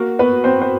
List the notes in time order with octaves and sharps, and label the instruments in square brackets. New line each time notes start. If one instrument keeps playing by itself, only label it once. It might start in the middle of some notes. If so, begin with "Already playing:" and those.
Already playing: [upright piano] A#3 A#4 [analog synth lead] F#4
[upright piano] B3 B4
C4 C5
C5